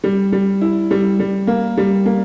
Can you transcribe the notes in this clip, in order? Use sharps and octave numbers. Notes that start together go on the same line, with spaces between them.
G3
G3
E4
G3
G3
A#3
G3
A#3